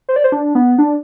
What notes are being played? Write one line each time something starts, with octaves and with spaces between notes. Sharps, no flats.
C5
D5
C5
D4
B3
D4